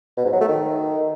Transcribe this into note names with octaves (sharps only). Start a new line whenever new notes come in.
B2
G#2
F#3
A3
D#3